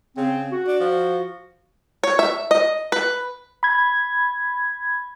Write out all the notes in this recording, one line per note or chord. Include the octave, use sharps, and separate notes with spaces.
C#3 C4
F#4
D4
F3
C#5
E5
D#5
B4
B5 G#6